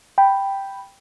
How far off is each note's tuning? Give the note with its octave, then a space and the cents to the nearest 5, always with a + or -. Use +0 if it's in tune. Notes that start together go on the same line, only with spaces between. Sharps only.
G5 +0 B5 +0